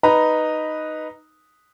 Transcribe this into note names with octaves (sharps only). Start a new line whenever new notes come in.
D#4 B4 A#5